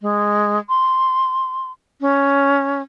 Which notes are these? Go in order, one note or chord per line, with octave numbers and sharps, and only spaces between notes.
G#3
C6
C#4